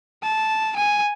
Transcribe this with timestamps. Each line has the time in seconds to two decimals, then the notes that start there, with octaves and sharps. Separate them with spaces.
0.23 A5
0.76 G#5